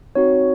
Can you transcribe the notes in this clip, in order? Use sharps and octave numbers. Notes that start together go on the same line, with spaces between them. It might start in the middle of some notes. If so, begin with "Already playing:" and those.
C4 D#4 F#4 C#5